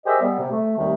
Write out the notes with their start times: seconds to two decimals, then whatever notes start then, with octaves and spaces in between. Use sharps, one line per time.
0.06 G4 G#4 A#4 C5 D#5 E5
0.21 G3 B3
0.39 C3
0.51 A3
0.78 D#2 C3 D#3 G3 A3 C4